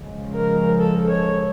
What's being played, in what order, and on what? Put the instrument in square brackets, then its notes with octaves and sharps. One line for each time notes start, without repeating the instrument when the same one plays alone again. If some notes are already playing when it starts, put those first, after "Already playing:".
Already playing: [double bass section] C#3 F3 G#3
[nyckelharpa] A#4
A4
C#5